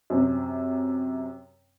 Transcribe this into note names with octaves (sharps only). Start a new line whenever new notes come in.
F#2 C3